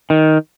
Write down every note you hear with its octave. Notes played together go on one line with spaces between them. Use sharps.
D#3